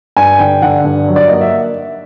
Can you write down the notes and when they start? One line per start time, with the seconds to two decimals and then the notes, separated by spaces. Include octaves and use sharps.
0.16 G2 G#5
0.39 D3 G5
0.62 D3 F#5
0.85 G2
1.08 F#3
1.16 D5
1.28 A#3 D#5
1.41 E5